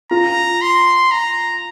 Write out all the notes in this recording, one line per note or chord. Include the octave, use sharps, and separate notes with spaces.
F4 A#5
C6
A#5